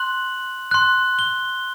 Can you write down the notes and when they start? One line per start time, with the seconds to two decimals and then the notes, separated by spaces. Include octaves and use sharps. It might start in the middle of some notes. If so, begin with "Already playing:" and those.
Already playing: C6 F#6 F#7
0.71 C6 F#6
1.19 G7